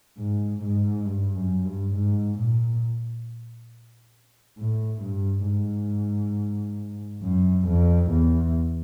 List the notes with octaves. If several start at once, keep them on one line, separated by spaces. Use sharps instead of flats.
G#2
G#2
G2
F#2
G2
G#2
A#2
A2
G2
G#2
F#2
F2
E2